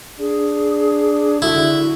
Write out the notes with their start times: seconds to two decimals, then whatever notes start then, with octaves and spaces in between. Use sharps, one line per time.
0.19 D4 G#4
1.42 D3 E4 F#4